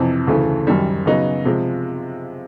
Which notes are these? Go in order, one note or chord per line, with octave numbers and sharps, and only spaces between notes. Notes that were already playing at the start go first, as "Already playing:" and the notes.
Already playing: F2 C3 E3
D2 C#3 E3 A3
F#2 D#3 G3
C#3 F#3 B3 D#4
C3 F3 G#3